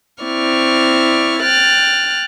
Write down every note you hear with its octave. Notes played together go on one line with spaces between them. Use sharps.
C4 E4 D5 C#6 F6
G5 F6 F#6 A6